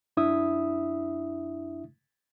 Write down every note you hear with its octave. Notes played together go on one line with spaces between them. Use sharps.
F#2 D4 E4 E5 D#6